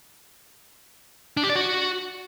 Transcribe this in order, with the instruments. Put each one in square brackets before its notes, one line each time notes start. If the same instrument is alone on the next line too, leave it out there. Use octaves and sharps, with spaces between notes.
[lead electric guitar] D4
G4
D5
F#4